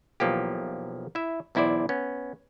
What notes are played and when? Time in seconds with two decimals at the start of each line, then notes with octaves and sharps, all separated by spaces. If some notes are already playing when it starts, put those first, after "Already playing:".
0.20 B1 E2 F3 A#3 G4
1.15 E4 E5
1.55 B1 E2 E4 C5 D5
1.89 B3 C#4